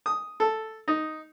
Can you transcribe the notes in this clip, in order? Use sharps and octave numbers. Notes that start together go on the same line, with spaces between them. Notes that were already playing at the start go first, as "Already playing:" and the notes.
D#6
A4
D#4